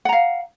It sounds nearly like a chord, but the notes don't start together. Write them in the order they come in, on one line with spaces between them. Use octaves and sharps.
F#5 A#5 F5